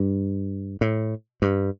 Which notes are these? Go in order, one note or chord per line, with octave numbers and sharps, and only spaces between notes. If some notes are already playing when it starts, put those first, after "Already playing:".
Already playing: G2
A2
G2